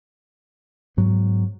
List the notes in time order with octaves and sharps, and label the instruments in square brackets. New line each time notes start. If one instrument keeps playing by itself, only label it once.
[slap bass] G#2 F#3 B3